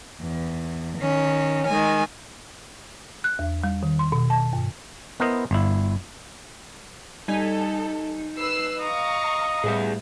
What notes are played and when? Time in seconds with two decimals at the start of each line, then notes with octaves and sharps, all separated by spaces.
0.21 E2
0.98 D#3 C#4
1.68 D#3 G#3 G#5
3.24 F#6
3.39 E2
3.64 G3
3.83 D#3
3.99 C6
4.12 B2
4.30 A5
4.53 G2
5.20 B3 E4 A#4 C5 D#5
5.51 G1 E4
7.28 G3 D#4 A4 G#5 B6
8.36 B4 E6 C7
8.79 D#5 F5 A#5 C#6
9.64 A2 G3 G#4 B4 E5